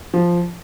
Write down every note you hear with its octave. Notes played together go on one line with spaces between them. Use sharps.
F3